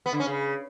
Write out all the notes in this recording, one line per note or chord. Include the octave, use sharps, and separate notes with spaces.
B3
D3
C#4
C#3